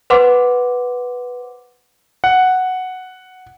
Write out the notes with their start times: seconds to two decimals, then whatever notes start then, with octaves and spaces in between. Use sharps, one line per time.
0.10 B4 C5 F#5 C6 D6
2.24 F#5